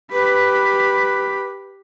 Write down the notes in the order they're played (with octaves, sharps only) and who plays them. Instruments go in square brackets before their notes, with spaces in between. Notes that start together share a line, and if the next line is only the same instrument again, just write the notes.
[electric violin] G4 B5 [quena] B4